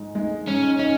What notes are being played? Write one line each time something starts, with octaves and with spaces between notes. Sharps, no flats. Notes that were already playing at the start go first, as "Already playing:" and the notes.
Already playing: G#2 G#3 D#4
G#3 D#4
G#2 C#4
C#4 D#4